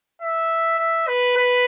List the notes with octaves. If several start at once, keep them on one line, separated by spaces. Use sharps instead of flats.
E5
E5
B4
B4